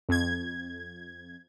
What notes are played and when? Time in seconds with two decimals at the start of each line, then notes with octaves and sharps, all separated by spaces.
0.09 F2 G#6